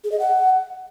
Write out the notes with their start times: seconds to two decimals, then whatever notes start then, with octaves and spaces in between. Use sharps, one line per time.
0.04 G#4
0.12 D#5
0.20 F#5